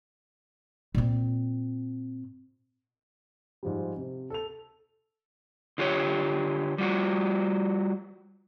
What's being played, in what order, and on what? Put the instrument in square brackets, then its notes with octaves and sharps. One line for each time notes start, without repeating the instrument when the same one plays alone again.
[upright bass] A#2 C4
[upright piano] G#2 F3 G3
C3
A4 F7
[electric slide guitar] D3 F4 G4 C#5
G3 F4 F#4